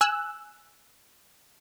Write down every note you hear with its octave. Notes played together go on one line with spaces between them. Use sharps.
G#5 E6 F#6